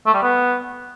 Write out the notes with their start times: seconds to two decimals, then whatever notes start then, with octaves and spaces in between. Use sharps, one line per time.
0.06 A3
0.14 G3
0.22 B3